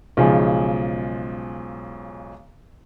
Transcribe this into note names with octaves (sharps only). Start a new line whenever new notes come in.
B1 C#3 F3 G#3